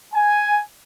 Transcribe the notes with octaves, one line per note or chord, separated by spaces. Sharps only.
G#5